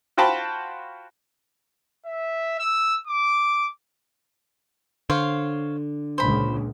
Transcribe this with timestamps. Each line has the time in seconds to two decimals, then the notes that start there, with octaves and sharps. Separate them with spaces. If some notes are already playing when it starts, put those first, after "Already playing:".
0.17 F4 F#4 C5 G5 A5 B5
2.06 E5
2.59 E6
3.07 D6
5.10 D3 C5 C#5 F5
6.18 C#2 A#2 C5 B5